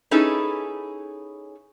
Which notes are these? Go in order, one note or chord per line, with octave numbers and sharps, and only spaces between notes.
C#4 D#4 E4 G#4 A4 B4